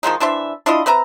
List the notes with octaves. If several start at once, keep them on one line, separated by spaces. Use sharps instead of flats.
D#3 F3 G#3 D#4
E3 D4 C5 E5
D4 E4 F4 D#5
C4 B4 E5 A#5